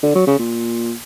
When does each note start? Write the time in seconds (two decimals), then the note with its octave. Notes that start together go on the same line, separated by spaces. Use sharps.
0.03 D3
0.15 F#3
0.27 C#3
0.39 A#2